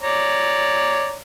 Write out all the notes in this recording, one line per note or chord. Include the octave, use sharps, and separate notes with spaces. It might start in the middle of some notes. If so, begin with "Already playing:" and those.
C#5 D5 A#5